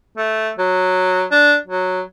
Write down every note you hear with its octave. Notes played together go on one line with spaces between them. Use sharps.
A3
F#3
D4
F#3